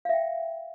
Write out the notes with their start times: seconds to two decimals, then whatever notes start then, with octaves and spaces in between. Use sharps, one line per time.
0.05 F5
0.09 E5
0.13 G5